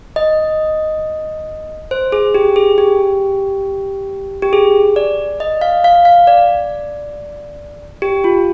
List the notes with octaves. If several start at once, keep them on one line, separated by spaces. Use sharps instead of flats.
D#5
C5
G#4
G4
G#4
G4
G4
G#4
D5
D#5
F5
F5
F5
D5
G4
F4